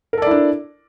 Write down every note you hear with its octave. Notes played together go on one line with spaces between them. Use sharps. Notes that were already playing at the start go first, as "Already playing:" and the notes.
D4 E4 A4 A#4 D5